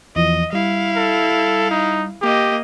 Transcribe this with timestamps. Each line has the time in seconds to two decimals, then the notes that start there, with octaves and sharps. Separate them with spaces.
0.16 E2 E3 F3 D#5
0.53 G3 E4 F5
0.96 A4
1.71 D#4
2.22 A#3 G4 D#5